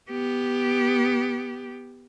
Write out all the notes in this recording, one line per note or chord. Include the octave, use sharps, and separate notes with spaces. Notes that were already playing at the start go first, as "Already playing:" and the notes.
B3 G4